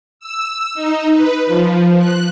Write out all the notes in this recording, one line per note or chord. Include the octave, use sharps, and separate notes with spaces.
E6
D#4
B4
F3
F#6